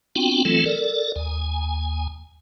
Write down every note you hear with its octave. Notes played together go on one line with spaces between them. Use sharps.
B3 C4 D4 F4 F#4 G5
E3 F#3 A3 C4 F4 A4
A4 A#4 D5
D#2 G#5